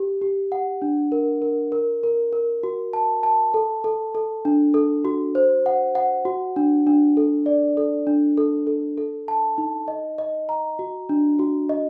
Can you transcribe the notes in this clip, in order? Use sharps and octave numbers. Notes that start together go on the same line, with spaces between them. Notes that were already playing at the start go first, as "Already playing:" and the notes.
Already playing: G4
G4
F#5
D4
A#4
A#4
A#4
A#4
A#4
F#4
A5
A5
A4
A4
A4
D4
A4
F#4
C5
F#5
F#5
F#4
D4
D4
A4
D5
A4
D4
A4
A4
A4
A5
D#4
D#5
D#5
A#5
F#4
D4
F#4
D#5